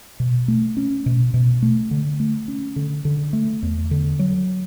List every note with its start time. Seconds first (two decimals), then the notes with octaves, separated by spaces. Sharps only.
0.20 B2
0.48 A3
0.77 C#4
1.06 B2
1.34 B2
1.62 A3
1.91 D3
2.20 A3
2.48 C#4
2.76 D3
3.05 D3
3.33 A3
3.63 E2
3.91 D3
4.19 F#3